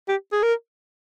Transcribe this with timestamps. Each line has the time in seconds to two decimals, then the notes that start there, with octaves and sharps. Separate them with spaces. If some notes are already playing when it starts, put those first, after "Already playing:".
0.08 G4
0.32 G#4
0.43 A#4